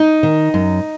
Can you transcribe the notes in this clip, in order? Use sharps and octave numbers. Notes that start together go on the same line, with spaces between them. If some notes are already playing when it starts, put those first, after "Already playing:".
Already playing: D#4
D#3
F#2